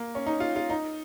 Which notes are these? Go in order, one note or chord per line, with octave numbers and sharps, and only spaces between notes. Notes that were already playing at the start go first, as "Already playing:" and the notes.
Already playing: A#3
C#4
D#4
F4
F4
D#4